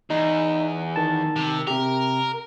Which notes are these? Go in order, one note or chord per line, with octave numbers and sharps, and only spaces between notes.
E2 D#4
D#3 A5
C3
C3 G4 A#4